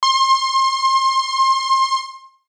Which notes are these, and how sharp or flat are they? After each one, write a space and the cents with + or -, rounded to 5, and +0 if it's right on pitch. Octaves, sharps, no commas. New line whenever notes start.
C6 +30